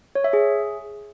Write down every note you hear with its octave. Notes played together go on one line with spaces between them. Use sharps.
C#5
E5
G#4